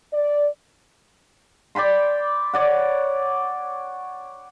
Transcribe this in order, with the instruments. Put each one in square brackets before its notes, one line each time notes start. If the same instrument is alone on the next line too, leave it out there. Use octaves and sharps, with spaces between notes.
[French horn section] D5
[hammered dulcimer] D5 G5 B5 C6
C#5 D5 F#5